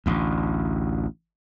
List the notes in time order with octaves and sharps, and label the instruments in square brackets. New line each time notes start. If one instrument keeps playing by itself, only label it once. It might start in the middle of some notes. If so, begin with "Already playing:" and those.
[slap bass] A1 D2